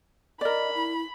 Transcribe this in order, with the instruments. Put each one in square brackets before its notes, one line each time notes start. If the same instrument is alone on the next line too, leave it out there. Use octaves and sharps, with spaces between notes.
[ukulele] A#4 D5 [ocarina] D#5 [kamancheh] B5
[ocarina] E4